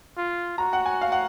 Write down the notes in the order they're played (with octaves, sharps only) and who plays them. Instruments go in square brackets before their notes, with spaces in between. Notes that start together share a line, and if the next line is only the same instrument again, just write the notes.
[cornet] F4
[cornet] F#4 [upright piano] A#5
[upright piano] F#5
G#5
F5
F#5